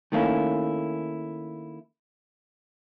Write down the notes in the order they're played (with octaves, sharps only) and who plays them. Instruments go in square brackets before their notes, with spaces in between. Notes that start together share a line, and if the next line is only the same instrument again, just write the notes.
[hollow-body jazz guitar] D#3 A3 A#3 C#4 E4